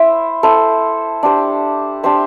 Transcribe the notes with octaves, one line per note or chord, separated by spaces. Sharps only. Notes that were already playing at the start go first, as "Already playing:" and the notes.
Already playing: E4 C5 E5
E4 A4 C5
D4 G4 C5
D4 G4 C5 E5